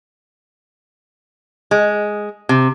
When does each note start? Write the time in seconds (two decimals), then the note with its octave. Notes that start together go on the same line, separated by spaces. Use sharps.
1.71 G#3
2.49 C3